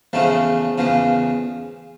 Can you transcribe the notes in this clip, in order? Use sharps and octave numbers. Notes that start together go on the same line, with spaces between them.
E2 C#3 F3 A3
E2 C#3 F3